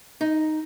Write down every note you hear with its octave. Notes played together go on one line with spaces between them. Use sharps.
D#4